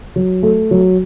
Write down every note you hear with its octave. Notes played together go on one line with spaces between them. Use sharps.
F#3
A3
F#3